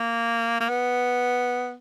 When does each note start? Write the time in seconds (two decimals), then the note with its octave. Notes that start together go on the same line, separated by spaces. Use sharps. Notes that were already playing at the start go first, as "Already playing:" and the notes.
Already playing: A#3
0.61 A#3
0.69 B3